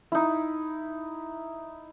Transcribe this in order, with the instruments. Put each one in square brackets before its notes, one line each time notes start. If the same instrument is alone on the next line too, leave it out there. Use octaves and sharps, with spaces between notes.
[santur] D#4 E4